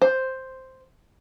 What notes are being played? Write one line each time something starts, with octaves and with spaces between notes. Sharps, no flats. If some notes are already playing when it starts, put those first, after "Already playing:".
C5